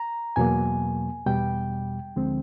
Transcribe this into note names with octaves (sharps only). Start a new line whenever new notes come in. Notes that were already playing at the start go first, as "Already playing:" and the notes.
Already playing: A#5
E2 B2 F#3 A#3 G#5
E2 B2 G3 G5
D2 D3 F3 G#3 C4